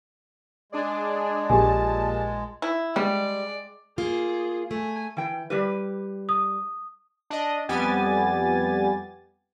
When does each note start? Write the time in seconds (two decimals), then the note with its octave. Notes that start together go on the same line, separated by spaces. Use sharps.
0.72 G#3 D4 G#4 D5
1.49 A#1 A#2 G4 G#4 G#5 A5
2.62 E4
2.96 G3 G#3 D5
3.98 A#3 F4 G#4
4.71 A3 G#5
5.17 E3 G5
5.50 G3 G4 B4
6.29 D#6
7.30 D4 D#5
7.69 F2 G3 B3 G4 G#5 A6